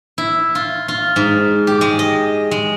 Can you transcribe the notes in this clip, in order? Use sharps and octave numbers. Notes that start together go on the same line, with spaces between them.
E4
F4
F4
G#2
G4
G#3
D#5
G#3